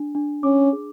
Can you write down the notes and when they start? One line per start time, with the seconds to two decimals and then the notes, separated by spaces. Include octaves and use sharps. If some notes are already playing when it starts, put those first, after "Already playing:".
Already playing: D4
0.15 D4
0.43 C#4 D6
0.73 G#4